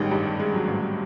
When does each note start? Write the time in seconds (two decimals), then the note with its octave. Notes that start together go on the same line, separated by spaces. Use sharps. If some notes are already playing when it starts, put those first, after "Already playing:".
Already playing: A1 D#3 G3 G#3
0.11 G2 G3
0.40 G#3
0.54 F#3
0.68 A1